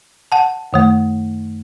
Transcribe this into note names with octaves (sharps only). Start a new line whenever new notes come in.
F#5 A5
F#2 D#3 A3